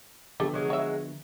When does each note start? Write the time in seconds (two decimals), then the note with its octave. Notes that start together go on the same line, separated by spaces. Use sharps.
0.40 D3 F3 B3 G4 A4
0.54 F#3 G#3 A#4
0.70 C#5 E5